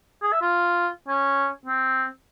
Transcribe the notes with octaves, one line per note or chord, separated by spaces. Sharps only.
G#4
E5
F4
C#4
C4